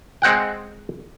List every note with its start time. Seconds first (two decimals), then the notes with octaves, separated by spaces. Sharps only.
0.22 G#3 C4 F#5 G5